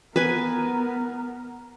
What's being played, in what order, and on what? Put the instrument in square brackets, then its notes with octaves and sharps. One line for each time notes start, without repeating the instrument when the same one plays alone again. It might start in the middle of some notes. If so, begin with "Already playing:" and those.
[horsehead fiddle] B3 A#4 [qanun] B4 G#5